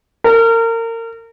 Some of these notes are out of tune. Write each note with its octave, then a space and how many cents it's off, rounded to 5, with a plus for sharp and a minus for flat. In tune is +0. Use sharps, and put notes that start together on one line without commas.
A#4 -30